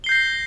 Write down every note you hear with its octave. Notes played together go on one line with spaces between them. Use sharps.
G6 A#6 C7 G7